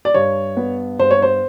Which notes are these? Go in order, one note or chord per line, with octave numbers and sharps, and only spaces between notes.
D5
G2 C#5
B3
G2 C5
C#5
C5